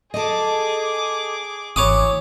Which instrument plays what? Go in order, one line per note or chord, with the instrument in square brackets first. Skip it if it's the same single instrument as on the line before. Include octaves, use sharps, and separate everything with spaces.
[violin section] G#4 D6 [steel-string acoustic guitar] A4 D#5
[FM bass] G#1 [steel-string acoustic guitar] E3 [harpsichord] C#5 D6 D#6